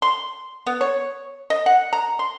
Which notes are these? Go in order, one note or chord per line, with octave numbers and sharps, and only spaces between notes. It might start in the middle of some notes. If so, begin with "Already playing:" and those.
C6
B3
C#5
D#5
F#5
A#5
C6